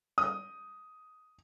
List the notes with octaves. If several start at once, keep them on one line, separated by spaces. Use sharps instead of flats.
D#6